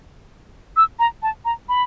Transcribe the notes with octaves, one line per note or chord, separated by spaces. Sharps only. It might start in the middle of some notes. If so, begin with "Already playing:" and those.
E6
A#5
A5
A#5
B5